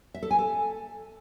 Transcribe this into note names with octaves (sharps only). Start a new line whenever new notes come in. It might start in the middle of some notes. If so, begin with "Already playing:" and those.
E5
A4
G#5
A4